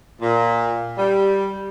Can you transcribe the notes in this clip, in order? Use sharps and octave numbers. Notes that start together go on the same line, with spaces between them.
A#2
G3